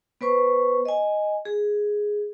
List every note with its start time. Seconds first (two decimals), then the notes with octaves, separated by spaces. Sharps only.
0.21 B3 B4 C5 C#6
0.85 D#5 G#5
1.45 G#4